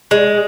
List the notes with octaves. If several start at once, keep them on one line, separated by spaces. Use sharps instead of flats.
G#3